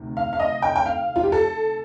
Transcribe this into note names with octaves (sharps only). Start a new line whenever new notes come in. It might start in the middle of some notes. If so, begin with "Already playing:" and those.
Already playing: D2 C3 D#3
F5
F5
D#5
G5
G5
F5
F4
G4
A4